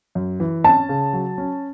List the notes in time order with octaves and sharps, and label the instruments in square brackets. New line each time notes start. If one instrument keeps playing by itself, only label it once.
[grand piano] F#2
E3
[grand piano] C#4 [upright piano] A5
[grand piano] C#3
F#3
C#4